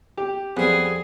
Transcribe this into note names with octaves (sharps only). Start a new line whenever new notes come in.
G4
F2 G3 B3 G#4